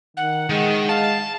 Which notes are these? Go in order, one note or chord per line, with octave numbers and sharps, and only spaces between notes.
D#3 F#5
D#3 G#3
F5 A5